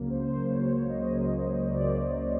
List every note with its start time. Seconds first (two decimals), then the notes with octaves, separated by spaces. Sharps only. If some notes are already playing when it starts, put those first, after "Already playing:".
Already playing: C#2 C#3 F#3 A#3
0.10 C5
0.30 C5
0.50 C#2 C#3 F#3 A#3 C#5
0.70 C#5
0.89 D#5
1.09 C#2 C#3 F#3 A#3
1.68 C#2 C#3 F#3 A#3 D5